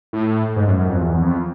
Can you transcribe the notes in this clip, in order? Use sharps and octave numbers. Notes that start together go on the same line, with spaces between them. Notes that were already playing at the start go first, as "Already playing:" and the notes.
A2
G#2
F#2
F#2
F2
E2
E2
F2